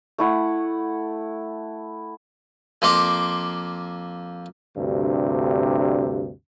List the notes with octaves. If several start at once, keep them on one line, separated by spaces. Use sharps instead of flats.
A3 E4 F#5
F2 A#3 C6 D6
D2 G2 C3